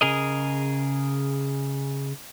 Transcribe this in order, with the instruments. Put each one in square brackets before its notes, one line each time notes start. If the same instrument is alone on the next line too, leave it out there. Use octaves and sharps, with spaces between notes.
[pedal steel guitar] C#3 G#4 A#4 D#5